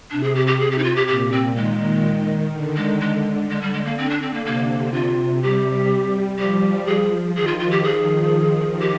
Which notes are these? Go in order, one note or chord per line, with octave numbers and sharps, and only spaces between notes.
C3 D4
G#4
G4
G4
G#4
G4
D#4
F4
G4
A#2 G4
C4
D#3 G#3
D3
G#3
G#3
D3 G#3
G3
G#3
A#3
C4
D4
C4
A#3
C3 A#3
F4
G3 G4
F3 G4
G#4
D#3 G#4
F4
F4
G4
G#4
G4